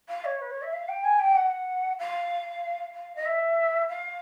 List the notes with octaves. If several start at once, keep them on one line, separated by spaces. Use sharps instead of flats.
F5
C#5
B4
C#5
E5
F5
G5
G#5
G5
F#5
F5
F5
D#5
E5
F5